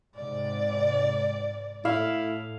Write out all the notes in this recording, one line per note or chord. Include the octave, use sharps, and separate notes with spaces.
G#2 C3 D5
A2 E4 F5